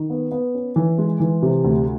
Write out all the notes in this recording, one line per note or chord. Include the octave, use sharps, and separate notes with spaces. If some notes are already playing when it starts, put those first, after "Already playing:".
Already playing: D#3
B3
B3
C#4
E3
G#3
E3
C3
D2